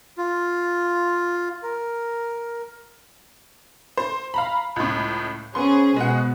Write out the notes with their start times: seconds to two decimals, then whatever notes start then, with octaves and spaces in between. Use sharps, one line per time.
0.17 F4
1.63 A#4
3.97 C5
4.34 F5 A#5 B5
4.76 C#2 A2
5.55 B3 C#4 G#4 C5 C6
5.96 B2 G#3 F#5